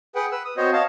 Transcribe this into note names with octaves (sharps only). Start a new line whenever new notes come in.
G#4 B4 F#5 G5
B4 E6
D#6
B3 C4 F#4 C5 C#5 D#5
C#5 D#5 F5 A5